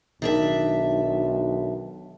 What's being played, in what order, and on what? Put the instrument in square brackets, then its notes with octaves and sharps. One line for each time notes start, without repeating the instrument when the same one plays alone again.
[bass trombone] B1 [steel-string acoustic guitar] D#3 D4 E5